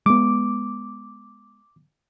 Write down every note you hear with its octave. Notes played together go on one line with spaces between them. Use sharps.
G#3 B3 D6